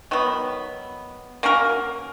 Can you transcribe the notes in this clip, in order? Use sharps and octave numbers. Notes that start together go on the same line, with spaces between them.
D#3 F#3 B3
A#3 C#4 F#4 A#4